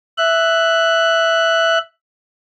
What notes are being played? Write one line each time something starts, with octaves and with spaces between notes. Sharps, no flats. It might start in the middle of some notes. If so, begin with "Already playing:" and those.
E5 F#6